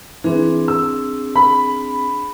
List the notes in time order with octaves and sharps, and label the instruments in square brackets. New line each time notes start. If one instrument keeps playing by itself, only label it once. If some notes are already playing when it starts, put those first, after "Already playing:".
[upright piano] E3 [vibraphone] C4 D4 G#4
[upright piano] E6
B5